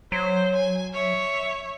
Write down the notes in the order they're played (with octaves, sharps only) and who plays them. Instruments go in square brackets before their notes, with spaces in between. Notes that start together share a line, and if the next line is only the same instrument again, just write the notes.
[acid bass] F#3 [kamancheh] C5
[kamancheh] G#5
C#5 E5